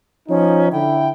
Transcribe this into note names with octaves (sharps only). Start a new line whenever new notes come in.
F3 C#4 D#4
D3 E4 G5